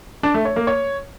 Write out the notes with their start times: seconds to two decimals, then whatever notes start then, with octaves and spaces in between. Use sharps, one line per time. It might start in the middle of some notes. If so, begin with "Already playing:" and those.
0.23 D4
0.34 A3
0.45 C#5
0.56 A#3
0.67 C#5